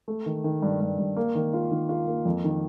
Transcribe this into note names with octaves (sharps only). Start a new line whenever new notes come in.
A3
D#3
D#3
G2
G2
G2
A#3
D#3
F4
D#3
F4
A#3
F2
D#3